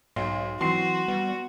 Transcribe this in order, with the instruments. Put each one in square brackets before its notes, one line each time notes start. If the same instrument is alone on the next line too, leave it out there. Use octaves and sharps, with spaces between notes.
[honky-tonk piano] B1 [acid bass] G#2 [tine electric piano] C6
[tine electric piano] E3 F#3 [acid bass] C4 [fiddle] F#4 [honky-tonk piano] C6 C7
[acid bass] G3 [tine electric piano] B3